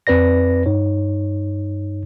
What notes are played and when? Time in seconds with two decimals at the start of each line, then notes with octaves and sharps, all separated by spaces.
0.07 F2 C4 B4 D5 A#6
0.66 G2 D#4 C#5